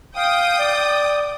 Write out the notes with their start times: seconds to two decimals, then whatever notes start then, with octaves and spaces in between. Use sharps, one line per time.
0.16 F5 G5 D#6
0.59 D5